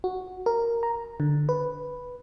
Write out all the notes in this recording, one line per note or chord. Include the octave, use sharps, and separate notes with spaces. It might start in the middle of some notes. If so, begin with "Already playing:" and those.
F#4
A#4
A#5
D3
B4